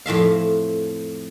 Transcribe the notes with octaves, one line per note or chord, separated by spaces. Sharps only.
F2 A2 E5 F5